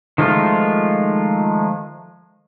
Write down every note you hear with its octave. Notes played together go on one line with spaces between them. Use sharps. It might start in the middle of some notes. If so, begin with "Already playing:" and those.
D#3 F3 G#3 A3 F4